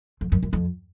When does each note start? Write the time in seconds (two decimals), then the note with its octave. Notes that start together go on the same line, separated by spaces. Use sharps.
0.21 F2
0.32 F#2
0.43 F#2
0.53 F2